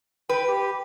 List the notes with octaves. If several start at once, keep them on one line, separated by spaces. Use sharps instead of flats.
B4 G5
G4